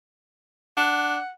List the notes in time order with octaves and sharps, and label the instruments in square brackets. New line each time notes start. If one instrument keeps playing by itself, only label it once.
[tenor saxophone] D4 [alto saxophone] F#5